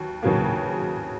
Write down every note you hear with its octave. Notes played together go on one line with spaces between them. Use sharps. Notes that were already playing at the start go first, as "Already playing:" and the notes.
Already playing: D#2 F#3
D#2 C#3 F#3 A#3